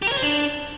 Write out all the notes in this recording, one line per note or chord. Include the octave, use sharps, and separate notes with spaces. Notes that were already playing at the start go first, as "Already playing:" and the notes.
G4
A#4
C#5
C5
D4